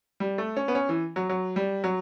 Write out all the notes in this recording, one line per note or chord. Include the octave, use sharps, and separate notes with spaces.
G3
A3
C#4
B3
C#4
E3
F#3
F#3
G3
F#3